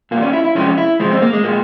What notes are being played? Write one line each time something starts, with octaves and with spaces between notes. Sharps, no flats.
A#2 G3 A#3
C#4
E4
E4
C3 F3 G#3 C#4
E4
C3 F3 G#3 C4
C4
A#3
G#3
A#2 G#3 A#3